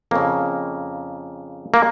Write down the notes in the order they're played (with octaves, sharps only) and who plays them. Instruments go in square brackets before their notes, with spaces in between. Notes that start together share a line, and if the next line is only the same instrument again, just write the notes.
[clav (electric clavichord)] F2 C#3 A#3
A#3